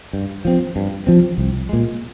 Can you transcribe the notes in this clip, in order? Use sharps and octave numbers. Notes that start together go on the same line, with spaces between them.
G2
F3 C4
G2
F3 C4
C2
A#2 G#3